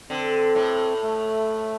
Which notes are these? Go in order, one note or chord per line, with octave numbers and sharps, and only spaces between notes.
D3 C4
A2
A3